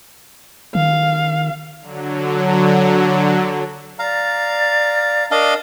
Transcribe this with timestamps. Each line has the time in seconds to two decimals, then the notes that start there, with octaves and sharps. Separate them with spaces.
0.75 D#3 F5
1.82 D3 F#3
3.99 D5 F5 A#5
5.31 D4 A#4 D#5 F5